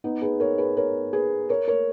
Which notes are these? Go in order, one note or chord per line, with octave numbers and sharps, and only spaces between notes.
B3 D#4
G#4 B4
A#4 C#5
G#4 B4
A#4 C#5
G#4 B4
A#4 C#5
A#4 C#5